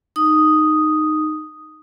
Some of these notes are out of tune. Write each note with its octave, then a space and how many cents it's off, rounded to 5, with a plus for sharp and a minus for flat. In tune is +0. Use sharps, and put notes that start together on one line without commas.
D#4 -10 D#6 +0